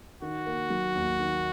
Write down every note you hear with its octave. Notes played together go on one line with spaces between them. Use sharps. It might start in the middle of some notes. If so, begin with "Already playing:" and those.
D#3 F#4
A#3
F#3
D#2
D#3